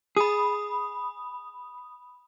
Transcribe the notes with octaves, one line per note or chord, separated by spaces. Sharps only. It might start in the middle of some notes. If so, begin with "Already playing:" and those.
G#4 B5 D#6